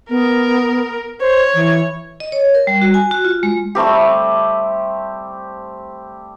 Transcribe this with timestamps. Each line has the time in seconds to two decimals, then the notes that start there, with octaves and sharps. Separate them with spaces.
0.10 B3 A#4
1.21 C5 C#5
1.54 E3
2.20 D#5
2.32 C#5
2.55 A#4
2.67 G3
2.82 F#4
2.94 G#5
3.11 F#4
3.25 F4
3.43 G#3
3.75 G3 A3 C4 G4